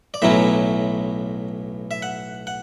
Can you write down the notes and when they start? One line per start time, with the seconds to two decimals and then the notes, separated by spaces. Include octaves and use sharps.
0.14 D5
0.22 B1 A2 F#3 C#4 E4 E5
1.91 E5
2.02 F#5
2.47 F#5